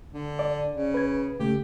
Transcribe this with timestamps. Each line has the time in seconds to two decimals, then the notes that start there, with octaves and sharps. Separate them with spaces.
0.13 D3
0.39 D5
0.72 C#3
0.94 B4 G#6
1.40 C#3 A3 G4